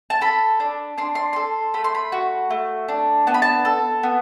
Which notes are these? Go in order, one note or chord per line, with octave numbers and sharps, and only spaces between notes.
A5
A4 B5
D4
D4 C6
C6
A4 C6
A3 B5
C6
B5
F#4
A3
D4
B3 A5
B5
A5
A4
B3